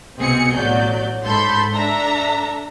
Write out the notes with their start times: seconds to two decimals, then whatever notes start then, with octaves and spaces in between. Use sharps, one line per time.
0.19 C2 B2 C4 G#4 C#7
0.56 A1 F#3 D5 G6
1.25 G#2 A4 B5 C6 G6
1.73 D4 A4 E5 A#5